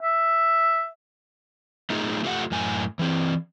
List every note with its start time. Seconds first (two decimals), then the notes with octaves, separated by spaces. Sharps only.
0.02 E5
1.90 A3 D#4 F4 G#4
2.24 A3 F4 G4 F5 F#5
2.51 F#2 A2 G#5
2.99 E3 C4